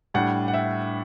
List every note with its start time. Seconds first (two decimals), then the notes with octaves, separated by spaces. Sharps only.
0.14 A2 G3 D4 F#5
0.48 F#5
0.54 E5